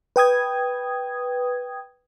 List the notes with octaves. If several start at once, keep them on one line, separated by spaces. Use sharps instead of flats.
B4 G5 D#6 G#6